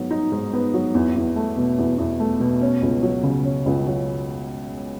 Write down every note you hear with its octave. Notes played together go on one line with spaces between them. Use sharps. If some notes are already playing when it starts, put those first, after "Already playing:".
Already playing: G#2 F#3 B3
D#4
G#2
B3
F#3
E2
E2
A3
B2
E2
E2
A3
B2
C#4
C#2
F#3
C#3
C#4
C#2
F#3